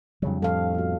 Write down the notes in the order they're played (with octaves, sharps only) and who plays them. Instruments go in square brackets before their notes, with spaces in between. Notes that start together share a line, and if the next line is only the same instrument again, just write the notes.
[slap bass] F2 C#3 F#3 [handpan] G3 D4
[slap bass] F2 A2 F3 [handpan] A4 F5
[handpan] B3 F#4